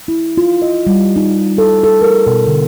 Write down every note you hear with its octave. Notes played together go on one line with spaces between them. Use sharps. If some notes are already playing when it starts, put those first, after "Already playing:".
E4
F4
D#5
G3
D#4
A4
A4
A#4
B2
D3